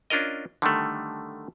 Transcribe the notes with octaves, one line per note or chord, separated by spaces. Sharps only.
C#4 D4 F4 A#4 D#5
D3 D#3 G3 A3